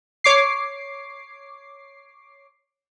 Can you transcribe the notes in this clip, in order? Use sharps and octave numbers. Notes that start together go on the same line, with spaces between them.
C#5 D6 C7